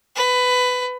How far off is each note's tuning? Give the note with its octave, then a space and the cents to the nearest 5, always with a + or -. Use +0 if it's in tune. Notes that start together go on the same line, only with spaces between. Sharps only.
B4 +15